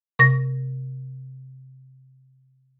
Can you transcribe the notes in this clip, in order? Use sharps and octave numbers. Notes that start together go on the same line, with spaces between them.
C3 A#6